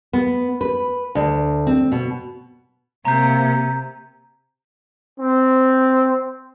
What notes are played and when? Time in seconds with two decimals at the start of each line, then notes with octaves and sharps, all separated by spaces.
0.13 B3
0.61 B4
1.15 D2
1.67 C4
1.92 B2
3.05 C3 A#3 A#5 G6
5.20 C4